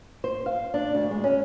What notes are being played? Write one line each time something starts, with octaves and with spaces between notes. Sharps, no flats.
C5
F5
D4
D2
G#3
C#4